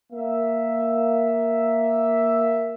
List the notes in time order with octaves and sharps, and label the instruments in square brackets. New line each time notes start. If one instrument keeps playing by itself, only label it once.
[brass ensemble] A#3 E5